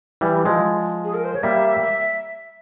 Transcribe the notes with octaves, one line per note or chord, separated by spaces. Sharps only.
E3 G3
F3 G#3
G#4
A#4
C5
C#5
G3 A#3 E5
E5